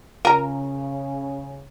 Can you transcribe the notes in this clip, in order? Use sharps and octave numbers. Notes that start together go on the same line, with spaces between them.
C#3 F4 A#4 A#5